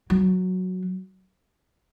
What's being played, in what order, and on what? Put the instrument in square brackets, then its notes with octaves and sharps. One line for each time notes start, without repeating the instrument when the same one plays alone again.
[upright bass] F#3